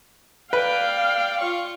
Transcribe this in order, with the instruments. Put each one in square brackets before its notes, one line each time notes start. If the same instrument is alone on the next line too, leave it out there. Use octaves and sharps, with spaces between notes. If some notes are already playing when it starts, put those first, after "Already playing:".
[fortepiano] B4 [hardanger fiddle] D5 G5 [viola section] F5
[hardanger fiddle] F4 C#6